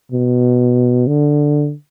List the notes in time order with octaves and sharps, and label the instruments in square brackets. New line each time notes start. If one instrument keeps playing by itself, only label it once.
[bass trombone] B2
D3